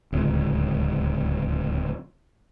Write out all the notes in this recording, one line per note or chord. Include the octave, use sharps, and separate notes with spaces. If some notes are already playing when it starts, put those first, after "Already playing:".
D1 C#2